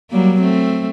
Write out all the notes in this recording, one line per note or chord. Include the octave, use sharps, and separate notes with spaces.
F#3 G3 A#3
A3 C4